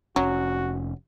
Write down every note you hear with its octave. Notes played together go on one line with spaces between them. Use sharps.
F1 F#3 C#4 F#4